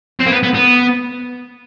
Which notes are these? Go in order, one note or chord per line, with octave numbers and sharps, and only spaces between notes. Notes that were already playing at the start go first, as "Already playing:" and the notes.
C4
A#3
B3
B3
B3